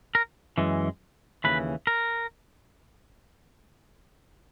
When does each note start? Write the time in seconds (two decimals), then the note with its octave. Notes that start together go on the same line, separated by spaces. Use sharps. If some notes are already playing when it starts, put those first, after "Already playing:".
0.15 A#4
0.58 F#2 E3 G#3
1.44 D#2 C#3 E3 B4
1.87 A#4